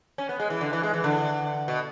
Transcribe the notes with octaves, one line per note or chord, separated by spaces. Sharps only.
C#4
B3
G#3
E3
D3
E3
G#3
E3
D3
B2